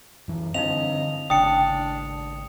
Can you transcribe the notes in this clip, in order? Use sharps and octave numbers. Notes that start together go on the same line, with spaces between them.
F#2 E3
G2 D3 C4 D#4 E4 D#5 F5 F7
G#1 C#3 D4 G5 D#6 C#7